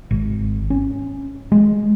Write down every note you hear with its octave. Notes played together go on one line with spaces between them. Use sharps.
G#1
C#4
G#3